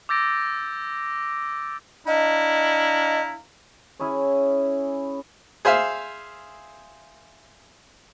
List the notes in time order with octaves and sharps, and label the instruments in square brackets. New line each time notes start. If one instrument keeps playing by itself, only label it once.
[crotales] D6 E6 G6 A6 A#6 D7
[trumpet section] D4 F5 A#5 [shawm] E4 [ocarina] D#5
[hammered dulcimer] C#4 E4 G#4 C#5
[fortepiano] G#4 C5 E5 F5